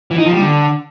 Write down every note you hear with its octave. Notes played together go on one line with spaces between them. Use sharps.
E3
D#4
F3
G3
D3